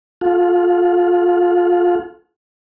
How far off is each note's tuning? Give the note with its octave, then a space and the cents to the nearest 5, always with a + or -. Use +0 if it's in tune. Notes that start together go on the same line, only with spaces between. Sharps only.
F4 +15 A4 -30 F#5 -40